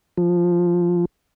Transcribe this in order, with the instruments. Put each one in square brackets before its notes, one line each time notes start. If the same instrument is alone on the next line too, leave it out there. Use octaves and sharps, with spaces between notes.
[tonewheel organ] F3